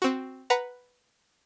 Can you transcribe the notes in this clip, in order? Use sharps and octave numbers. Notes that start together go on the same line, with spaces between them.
C4 F#4
B4 F#5 A#5